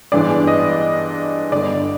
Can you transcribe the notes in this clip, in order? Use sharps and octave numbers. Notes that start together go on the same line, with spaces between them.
G2 E3 G#3 B3 D4 D5
D#5
G1 G2 D3 D5